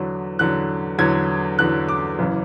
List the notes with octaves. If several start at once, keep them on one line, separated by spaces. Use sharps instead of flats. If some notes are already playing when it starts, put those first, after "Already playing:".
Already playing: E2 D3 F#3
E2 D3 F#3 F#6
E2 D3 F#3 G#6
E2 D3 F#3 F#6
D6
F#1 F#2 E3